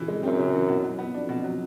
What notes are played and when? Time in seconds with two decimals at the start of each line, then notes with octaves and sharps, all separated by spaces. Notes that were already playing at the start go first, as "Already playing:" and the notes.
Already playing: C#3 E3
0.08 G#3
0.23 F#2 C4
0.38 C#3
0.53 E3
0.68 B2
0.83 F#3
0.99 B3
1.14 F2 D4
1.29 B2
1.44 F#3